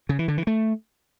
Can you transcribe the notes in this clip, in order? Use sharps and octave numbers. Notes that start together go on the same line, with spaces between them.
C#3
E3
D3
E3
A3